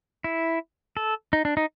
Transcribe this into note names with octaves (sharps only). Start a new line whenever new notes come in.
E4
A4
D#4
D4
D#4